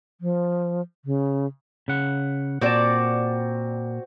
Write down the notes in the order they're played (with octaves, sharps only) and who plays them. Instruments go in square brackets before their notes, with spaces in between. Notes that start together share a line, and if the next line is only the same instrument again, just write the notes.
[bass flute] F3
C#3
[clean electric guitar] C#3 F#5
[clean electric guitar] A#2 A5 [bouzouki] C4 F#4 D5